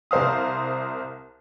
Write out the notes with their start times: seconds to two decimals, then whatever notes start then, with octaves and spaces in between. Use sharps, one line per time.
0.11 C2 A#4 C5 F5 D#6